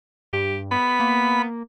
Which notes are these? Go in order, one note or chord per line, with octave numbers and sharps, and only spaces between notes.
G2 G4
B3 B5
A#3